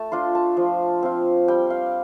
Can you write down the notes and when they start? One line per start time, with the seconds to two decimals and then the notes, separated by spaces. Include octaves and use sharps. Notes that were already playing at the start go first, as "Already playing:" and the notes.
Already playing: A3 A5
0.12 D4 F4 C6
0.35 A5
0.57 F3
1.03 C4 F4
1.48 G3 G5
1.70 F5